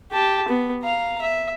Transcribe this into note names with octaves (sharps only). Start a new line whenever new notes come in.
G4 A5
B3
F5 A#5
E5